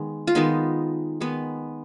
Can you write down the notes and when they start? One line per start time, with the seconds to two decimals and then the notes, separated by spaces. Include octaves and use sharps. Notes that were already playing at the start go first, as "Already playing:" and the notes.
Already playing: D#3 G#3 B3
0.27 F4
0.35 D#3 G#3 B3 D#4
1.21 D#3 G#3 B3